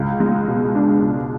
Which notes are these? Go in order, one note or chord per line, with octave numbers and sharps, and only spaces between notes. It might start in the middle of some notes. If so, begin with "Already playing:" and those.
Already playing: C#2
G#3
B2
D4
C#2